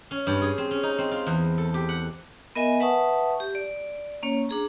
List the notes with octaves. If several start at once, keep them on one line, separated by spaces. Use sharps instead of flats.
C#4
G2
G#4
C4
C#4
D#4
C4
F4
E2
A4
G4
F#5
B3 A#4 D#5 E5 G#5
B4 E5 F#5 A5 C#6 D#6
G4
D5
A#3 C#4 C#5
D4 G#4 A#5